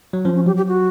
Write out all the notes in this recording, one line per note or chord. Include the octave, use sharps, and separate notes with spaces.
F#3
F3 C#4
C#4
F#3 G4
G4
F#4